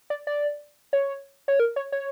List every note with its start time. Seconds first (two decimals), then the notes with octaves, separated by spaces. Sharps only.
0.10 D5
0.27 D5
0.93 C#5
1.48 C#5
1.60 A#4
1.76 C#5
1.92 C#5